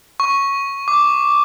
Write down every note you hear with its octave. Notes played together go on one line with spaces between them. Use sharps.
C#6
D6